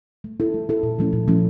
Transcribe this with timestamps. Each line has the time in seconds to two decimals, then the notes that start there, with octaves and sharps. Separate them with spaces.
0.24 A3
0.40 E4 A4
0.54 A3
0.69 E4 A4
0.83 A#2
0.99 F3 A3 C#4 E4
1.13 A#2
1.28 F3 A3 C#4 E4